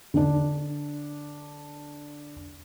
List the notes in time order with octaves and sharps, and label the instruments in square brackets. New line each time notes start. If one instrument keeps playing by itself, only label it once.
[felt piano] D3 D4